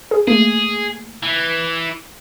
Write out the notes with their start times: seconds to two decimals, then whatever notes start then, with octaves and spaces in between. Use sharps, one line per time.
0.11 G#4
0.28 A3 A#3 G#4
1.23 E3